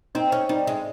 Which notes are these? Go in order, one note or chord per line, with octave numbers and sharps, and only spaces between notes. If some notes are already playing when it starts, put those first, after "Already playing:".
C4 D#4
C#4
G3 D#4
G#3